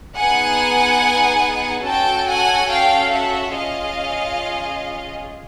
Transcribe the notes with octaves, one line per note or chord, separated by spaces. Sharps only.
B3 D#4 G#4 F#5 G#5
C#4 F#4 A4 G5 A5
F#5 G#5
F5 G5
E5 F#5
C#4 F4 G#4 D#5 F5